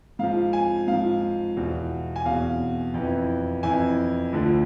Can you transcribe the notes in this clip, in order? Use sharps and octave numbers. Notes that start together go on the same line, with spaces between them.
G#2 F3 F5
G#5
G#2 F3 F5
E2 B2
G#5
E2 B2 F5
F2 E3
F2 E3 G#5
D2 D3 F3